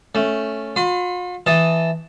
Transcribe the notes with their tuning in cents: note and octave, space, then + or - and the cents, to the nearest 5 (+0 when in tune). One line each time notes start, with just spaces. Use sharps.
A3 +0 C#4 +0
F4 +45 C6 -40
E3 +0 D#5 +0 A5 +0